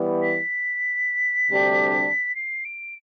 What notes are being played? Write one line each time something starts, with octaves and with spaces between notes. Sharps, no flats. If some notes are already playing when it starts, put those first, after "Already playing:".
Already playing: E3 G3 B3
B6
D2 C3 G3 D4 G4
C7
D7